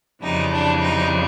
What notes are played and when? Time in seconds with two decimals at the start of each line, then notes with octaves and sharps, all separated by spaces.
0.23 F2 C#3 E3 G3 D#4
0.52 D4
0.82 D#4